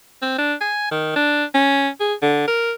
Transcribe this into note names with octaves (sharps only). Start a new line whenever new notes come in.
C4
D4
G#5
D#3
D4
C#4
G#4
D3
A#4